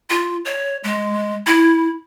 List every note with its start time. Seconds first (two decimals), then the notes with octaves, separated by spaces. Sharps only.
0.10 F4
0.45 C#5
0.84 G#3
1.47 E4